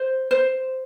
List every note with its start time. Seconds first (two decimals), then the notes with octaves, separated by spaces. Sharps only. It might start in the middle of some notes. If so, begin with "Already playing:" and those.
Already playing: C5
0.31 C5